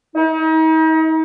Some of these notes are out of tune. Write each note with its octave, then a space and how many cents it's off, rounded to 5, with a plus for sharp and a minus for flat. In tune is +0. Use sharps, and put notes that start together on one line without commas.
D#4 +40